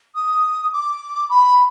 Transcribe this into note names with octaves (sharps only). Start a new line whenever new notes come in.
D#6
D6
B5